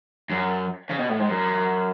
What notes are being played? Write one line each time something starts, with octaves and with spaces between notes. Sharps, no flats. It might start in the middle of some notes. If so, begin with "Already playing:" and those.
F#2
C#3
B2
A2
G#2
F#2